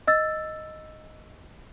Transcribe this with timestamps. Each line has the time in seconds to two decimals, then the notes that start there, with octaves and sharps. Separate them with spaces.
0.07 D#5 E6 A6